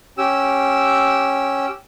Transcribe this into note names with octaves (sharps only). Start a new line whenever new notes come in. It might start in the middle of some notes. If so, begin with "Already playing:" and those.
C#4 G4 E6